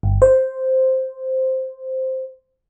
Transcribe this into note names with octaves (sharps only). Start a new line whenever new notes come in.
G1
C5